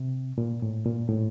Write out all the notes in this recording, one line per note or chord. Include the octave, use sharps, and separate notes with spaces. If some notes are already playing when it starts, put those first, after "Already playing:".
Already playing: C3
A#2
A2
A#2
A2